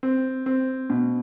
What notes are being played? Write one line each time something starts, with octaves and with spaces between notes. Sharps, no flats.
C4
C4
B2